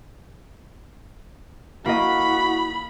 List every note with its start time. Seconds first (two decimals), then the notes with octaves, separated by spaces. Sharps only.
1.86 A#3 E4 F#4 D#5 B5